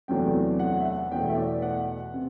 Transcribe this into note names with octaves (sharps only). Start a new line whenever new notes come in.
E2 C3 F#3 A3 D4 G5
F#5
E5
F#5
F#5
E2 B2 A3 G5
E5
D5
F#5
C3